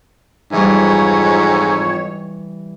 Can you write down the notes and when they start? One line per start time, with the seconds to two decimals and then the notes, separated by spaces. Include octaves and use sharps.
0.52 F2 G#2 E3 G3 C#5